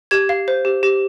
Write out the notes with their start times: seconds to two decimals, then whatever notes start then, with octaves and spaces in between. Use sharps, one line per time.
0.11 G4 G#6
0.29 F5
0.48 C5
0.65 G4
0.83 G4